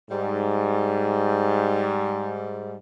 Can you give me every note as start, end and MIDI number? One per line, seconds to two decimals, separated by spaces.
0.11 2.76 44
0.11 2.76 55